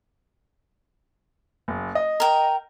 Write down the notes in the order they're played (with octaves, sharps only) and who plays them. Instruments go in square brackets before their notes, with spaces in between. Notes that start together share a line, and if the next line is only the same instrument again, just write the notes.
[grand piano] F#1
D#5
[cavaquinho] A#4 G5